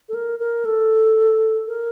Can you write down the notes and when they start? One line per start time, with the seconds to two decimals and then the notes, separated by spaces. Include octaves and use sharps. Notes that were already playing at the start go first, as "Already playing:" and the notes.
0.09 A4
0.14 A#4
0.40 A#4
0.65 A4
1.67 A#4